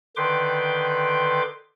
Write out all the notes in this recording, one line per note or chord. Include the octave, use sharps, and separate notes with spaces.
D3 D#3 B4 G5 C6 D6